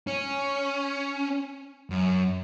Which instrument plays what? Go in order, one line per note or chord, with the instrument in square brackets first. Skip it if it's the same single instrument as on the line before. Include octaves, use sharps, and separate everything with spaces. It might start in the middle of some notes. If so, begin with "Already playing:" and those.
[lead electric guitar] C#4
F#2